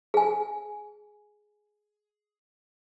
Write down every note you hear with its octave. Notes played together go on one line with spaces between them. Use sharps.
G#4 G#5